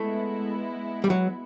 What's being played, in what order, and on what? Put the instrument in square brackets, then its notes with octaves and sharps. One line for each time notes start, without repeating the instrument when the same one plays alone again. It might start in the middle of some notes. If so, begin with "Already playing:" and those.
Already playing: [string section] G#3 B3 E4 [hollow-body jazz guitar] A3
[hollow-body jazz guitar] G3
F#3